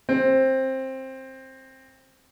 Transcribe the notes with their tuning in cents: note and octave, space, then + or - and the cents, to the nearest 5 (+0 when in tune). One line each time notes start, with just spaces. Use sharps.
C4 +15